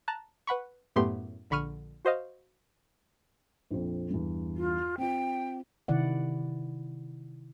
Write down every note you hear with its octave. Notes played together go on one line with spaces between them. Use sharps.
A5 A#5 F#6
B4 F#5 B5 C#6
F#2 A2 A3 B3 G4 C6
A#1 D3 B5 C#6 F6 D#7
F#4 C5 D#5 F5
A#1 F2
E2 G2
F4
C4 F4 G5
C3 D#3 E4 D5 F#5